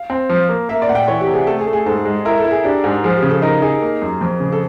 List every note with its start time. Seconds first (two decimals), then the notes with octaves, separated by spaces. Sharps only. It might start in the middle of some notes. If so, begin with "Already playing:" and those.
Already playing: F5
0.10 C4
0.29 F3
0.49 A#3
0.69 A#3 E5
0.82 D5
0.89 A#2 F#5
0.95 G5
1.07 E3 C#5
1.21 G4
1.27 C3
1.33 G#4
1.47 A3 A4
1.59 G#4
1.66 A3
1.73 G#4
1.86 G#2 A4
2.05 G#3
2.25 E4 A#4
2.38 A4
2.45 E4
2.51 G#4
2.64 D4 G4
2.84 G#2 G#4
3.04 F3 G#4
3.17 G4
3.22 C#3
3.30 A4
3.42 D#4 A#4
3.62 D#4 G#4
3.82 A#3
4.02 F#2
4.21 F2
4.40 C#3
4.52 A4